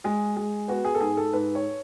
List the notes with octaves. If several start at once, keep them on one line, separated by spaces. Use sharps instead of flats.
G#3 G#4
G#3
B3 F#4
G#4
A4
G#2 G#4
A4
G#2 B4
C#5